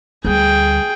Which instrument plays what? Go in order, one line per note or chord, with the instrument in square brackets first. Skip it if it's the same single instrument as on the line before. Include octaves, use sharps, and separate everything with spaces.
[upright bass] D2 G3 [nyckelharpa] G#4 G5